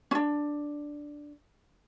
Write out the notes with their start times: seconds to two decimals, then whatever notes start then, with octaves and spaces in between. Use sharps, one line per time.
0.11 C#4 D4